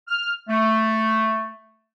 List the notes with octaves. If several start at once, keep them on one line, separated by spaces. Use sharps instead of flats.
F6
A3